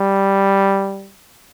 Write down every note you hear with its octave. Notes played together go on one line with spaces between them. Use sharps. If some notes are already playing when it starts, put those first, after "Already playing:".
Already playing: G3